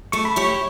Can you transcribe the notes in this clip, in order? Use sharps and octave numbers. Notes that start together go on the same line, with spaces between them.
A3 C#6
B5
E4 G4 C#5 C#6